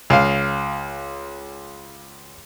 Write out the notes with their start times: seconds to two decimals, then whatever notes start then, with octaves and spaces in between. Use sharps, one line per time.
0.10 C#2 F5